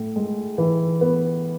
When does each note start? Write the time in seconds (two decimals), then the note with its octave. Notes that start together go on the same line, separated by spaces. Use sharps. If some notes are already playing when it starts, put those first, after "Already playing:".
Already playing: A2
0.16 G#3
0.58 E3
1.01 B3